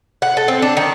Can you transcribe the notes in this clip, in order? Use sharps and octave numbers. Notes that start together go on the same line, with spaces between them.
F#5
A4
C4
D4
D#3